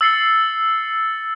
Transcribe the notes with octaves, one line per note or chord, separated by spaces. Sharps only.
E6 A6 C7 C#7 G7